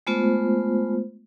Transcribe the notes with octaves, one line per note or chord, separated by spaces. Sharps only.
G#3 A3 B3 F4 C5